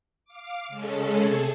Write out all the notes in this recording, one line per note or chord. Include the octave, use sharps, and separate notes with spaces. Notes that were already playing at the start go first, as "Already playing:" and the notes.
F5 D6
C#3 G#3 C#4 A4
C3 A3 G#4 A4 G#6 C7